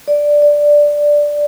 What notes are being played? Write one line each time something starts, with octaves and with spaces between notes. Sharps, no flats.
D5
D5